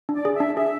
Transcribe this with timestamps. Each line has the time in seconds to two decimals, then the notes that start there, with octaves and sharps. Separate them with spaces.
0.09 D4
0.14 D5
0.25 G#4
0.35 D4 E5
0.57 G#4 E5